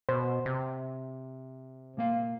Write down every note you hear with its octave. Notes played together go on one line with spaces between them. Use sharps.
B2 C5
C3
A#2 A#3 F5